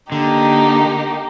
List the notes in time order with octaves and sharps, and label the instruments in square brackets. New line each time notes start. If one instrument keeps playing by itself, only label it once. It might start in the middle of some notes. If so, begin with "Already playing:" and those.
[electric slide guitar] D3 [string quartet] A#3 D#4 G4